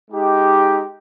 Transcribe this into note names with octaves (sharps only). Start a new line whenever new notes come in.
G#3 D#4 G4